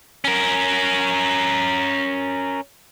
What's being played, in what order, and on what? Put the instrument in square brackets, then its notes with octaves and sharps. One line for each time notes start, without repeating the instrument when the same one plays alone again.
[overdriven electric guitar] C#4 A#4